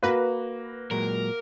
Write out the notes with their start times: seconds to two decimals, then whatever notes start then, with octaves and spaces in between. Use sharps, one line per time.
0.03 A#3 F#4 B4
0.91 A#2 F#3 G#3 A#4